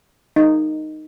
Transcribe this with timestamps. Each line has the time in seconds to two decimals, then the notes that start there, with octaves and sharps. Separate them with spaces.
0.36 D#4